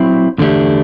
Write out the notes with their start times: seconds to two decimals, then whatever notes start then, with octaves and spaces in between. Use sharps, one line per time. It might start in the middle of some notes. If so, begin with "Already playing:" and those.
Already playing: F#3 C4 E4
0.38 E2 D3 A3 D4 G4